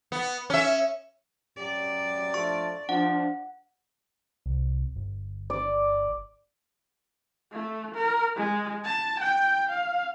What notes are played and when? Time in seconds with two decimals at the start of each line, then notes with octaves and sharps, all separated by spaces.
0.12 B3
0.50 C#4 E5
1.57 F#2 F#3 G4 D5
2.34 F3 A3 D4 C#6
2.89 F3 D4 F#5
4.46 C2
4.96 G1
5.50 D5
7.53 A3
7.95 A#4
8.36 G#3
8.84 A5
9.20 G5
9.69 F5